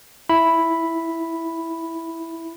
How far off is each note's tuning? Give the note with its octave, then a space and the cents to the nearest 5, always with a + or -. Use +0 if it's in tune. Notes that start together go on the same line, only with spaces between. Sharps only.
E4 +0 B5 +0